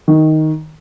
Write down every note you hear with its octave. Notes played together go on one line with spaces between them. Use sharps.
D#3